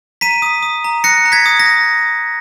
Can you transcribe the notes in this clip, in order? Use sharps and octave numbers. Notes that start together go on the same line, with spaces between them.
A#5 B6 D#7
D#6
D#6
A#5
F#6 A#6 C#7
A#5
G#6 B6
D#6
A#6
D#6